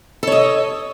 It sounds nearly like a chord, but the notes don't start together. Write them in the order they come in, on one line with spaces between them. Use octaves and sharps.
A4 C#5 D#5